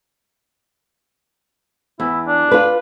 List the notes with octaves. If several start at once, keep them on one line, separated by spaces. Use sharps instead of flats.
E2 E4
D4
F4 B4